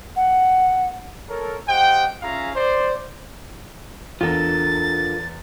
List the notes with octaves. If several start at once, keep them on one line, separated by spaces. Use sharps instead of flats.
F#5
A4 A#4 C#5
G4 C5 D#5 F#5 G5
C#4 F4 G#4 E5 F5 A#5
C5 D5
E2 D4 F4 A4 A#4 A6